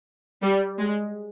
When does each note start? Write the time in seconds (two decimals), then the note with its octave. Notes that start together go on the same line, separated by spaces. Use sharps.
0.43 G3
0.79 G#3